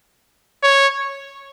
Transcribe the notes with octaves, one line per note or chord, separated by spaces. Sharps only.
C#5